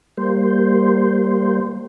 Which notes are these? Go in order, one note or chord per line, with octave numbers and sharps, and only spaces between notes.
G3 A#3 C5